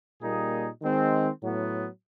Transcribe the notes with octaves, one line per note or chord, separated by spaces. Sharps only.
A#2 G3 A#3 D#4 G#4
D#3 G#3 C4
A2 F#3 B3